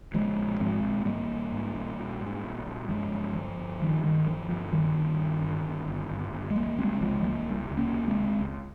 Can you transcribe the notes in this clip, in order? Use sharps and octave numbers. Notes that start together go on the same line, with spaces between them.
A#1 F3 G#3
A#1
G#2 G#3 C4
A#1
G#2 G3 A#3
A#1
G#2
A#1
A#1
G#2
A#1
A#1
G2 F3 G#3
G2
G1 F3
G1
G2 D#3 G3
G2 D#3
G1 F3
G2 F3
G1 D#3 G3
G2
G2
G1
G1
G1
G1
G1
G#3
C#2 G3 A#3
C3 G#3 C4
C#2 F3 G#3
C#2 G3 A#3
C3
C#2
A#3 C#4
C3
G#3 C4
C#2
C#2